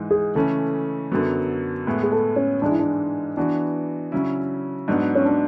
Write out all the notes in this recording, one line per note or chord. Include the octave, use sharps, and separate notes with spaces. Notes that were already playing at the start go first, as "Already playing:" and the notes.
Already playing: G#2 E3 G#3
G#4
C#3 E3 A3 C#4 A4
F#2 D3 F#3 B3
A2 G#3 B3 E4
G#4
A4
C#4
G#2 E3 G#3 D4
E4
D4
E3 B3 D4 F#4
C#3 F#3 C#4 E4
G#2 F#3 B3 D4
C#4
D4